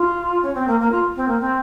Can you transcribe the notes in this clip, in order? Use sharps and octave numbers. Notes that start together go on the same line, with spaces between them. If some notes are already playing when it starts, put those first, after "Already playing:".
Already playing: F4
C#4
C4
A#3
A#3
F4
C4
A#3
C4